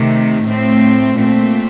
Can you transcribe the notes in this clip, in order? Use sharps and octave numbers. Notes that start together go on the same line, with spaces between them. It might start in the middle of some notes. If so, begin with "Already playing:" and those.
Already playing: C3 D#3 A3
A2 A3 C4
A#2 A3 C4